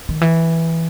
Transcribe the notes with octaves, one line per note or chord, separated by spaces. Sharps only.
D#3
E3